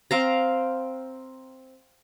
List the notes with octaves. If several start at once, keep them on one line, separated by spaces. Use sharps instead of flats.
C4 F5 A#5